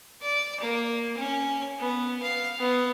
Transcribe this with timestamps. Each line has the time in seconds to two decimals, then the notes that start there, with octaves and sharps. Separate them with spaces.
0.21 D5
0.60 A#3
1.17 C#4
1.79 B3
2.23 F5
2.59 B3